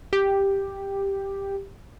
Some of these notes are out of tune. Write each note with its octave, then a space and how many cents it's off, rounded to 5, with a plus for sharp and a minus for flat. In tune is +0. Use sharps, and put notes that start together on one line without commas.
G4 +5